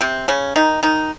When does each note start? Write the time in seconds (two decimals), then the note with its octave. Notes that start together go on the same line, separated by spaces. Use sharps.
0.01 C3 C4
0.28 C#3 C#4
0.56 D#3 D#4
0.83 D#3 D#4